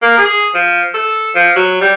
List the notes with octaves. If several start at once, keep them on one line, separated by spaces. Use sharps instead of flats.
A#3
G#4
F3
A4
F3
F#3
G3